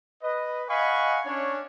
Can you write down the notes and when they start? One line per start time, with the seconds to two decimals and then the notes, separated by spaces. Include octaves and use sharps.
0.23 B4 D#5
0.70 D#5 F5 F#5 G#5 B5 C#6
1.26 C#4 D4 C#5